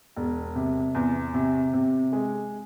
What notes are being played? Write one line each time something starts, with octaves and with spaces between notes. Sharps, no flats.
E1
C3
E2
C3
C3
G#3